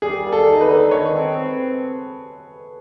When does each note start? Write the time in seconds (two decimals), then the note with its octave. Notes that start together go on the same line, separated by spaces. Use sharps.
0.02 G3 G#4
0.25 A#3
0.33 A4
0.47 D#4
0.61 B4
0.69 D3
0.91 D#3 C#5
1.13 C4
1.36 C4